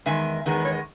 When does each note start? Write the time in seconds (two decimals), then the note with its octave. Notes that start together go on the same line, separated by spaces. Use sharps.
0.06 E2 D#3 G#3 E5 G#5
0.46 E2 D#3 G#3 B3
0.57 B4
0.65 C#5
0.72 D#5